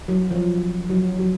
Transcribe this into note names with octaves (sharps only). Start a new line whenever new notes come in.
F#3
F3
F#3
F#3